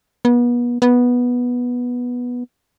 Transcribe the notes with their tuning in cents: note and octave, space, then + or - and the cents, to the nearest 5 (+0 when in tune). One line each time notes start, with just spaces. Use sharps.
B3 -35
B3 -10